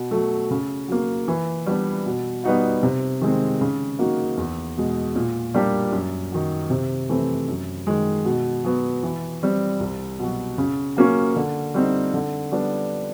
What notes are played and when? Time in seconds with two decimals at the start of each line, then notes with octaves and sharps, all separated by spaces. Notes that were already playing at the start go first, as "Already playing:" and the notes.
Already playing: B2
0.11 F#3 A3
0.51 C#3
0.88 F#3 A#3
1.28 E3
1.66 G3 B3 D4
2.06 B2
2.44 G3 B3 D#4 F#4
2.83 C3
3.21 D#3 G#3 C4
3.61 C#3
3.99 F#3 A#3 D#4 F#4
4.37 E2
4.77 B2 G#3
5.16 A#2
5.54 G3 A#3 D4 G4
5.92 F#2
6.32 D#3 F#3
6.70 C3
7.09 E3 A3 C4
7.48 F#2
7.87 D#3 G#3
8.25 B2
8.64 F#3 B3
9.03 E3
9.42 G3 C4
9.80 C2
10.19 B2 F#3
10.58 C#3
10.97 F#3 A#3 C#4
11.36 D3
11.74 G3 C4 D#4
12.13 D3
12.52 G3 B3 D4